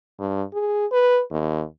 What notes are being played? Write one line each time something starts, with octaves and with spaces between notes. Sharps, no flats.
G2
G#4
B4
D#2